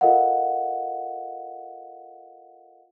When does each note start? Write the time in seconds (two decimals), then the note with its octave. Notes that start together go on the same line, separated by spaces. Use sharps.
0.01 F4 A4 A#4 D#5 F5 F#5